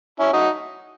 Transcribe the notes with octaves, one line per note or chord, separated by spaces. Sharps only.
C#4 E4
D#4 F#4